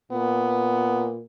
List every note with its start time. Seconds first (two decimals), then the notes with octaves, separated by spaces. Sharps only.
0.12 A#2 B3